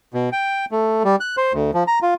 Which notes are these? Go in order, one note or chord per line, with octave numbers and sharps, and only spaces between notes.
B2
G5
A3
G3
F#6
C5
D2
F3
A#5
F4